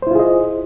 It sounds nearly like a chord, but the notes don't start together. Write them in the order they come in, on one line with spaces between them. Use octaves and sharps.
C5 E4 F4 G#4 D#5